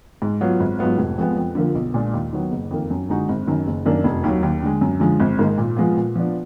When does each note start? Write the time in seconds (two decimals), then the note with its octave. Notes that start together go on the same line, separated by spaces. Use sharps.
0.22 G#2
0.41 F#3 B3 F4
0.60 G#1
0.79 G#2 F#3 B3 F4
0.98 F1
1.18 F2 F3 G#3 B3
1.37 F2
1.55 D3 F3 A#3 F4
1.75 B1
1.94 A#2 G#3 D4 F4
2.14 D#2
2.33 D#3 F#3 B3
2.51 F#1
2.71 F2 D#3 A#3
2.90 F#2
3.09 D3 G#3 D#4 F#4
3.29 G#1
3.48 F#2 D#3
3.67 F#1
3.86 F#2 D#3 A#3 D4
4.04 F1
4.24 D#2 D#3 F#3
4.43 D#2
4.63 D3 G#3
4.81 F#2
5.00 D3 F3 G#3
5.20 G#1
5.39 G#2 D#3 A#3 D#4
5.58 A#2
5.77 F3 G#3 B3 F4
5.97 A#2
6.15 F3 B3 D4